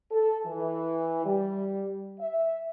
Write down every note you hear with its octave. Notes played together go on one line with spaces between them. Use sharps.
A4
E3
G3
E5